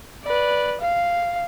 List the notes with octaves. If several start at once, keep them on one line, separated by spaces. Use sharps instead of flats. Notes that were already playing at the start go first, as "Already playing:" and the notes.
B4 D5
F5